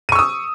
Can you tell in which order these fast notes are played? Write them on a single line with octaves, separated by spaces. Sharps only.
D#7 C#6 E6 D#6